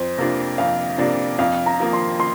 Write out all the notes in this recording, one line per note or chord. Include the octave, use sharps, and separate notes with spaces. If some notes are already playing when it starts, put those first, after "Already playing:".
Already playing: F2 C5
C3 A#3 D4 F4
F2 F5
C3 A#3 D4 F4 D5
F2 F5
A#5
F3 A#3
C6
C6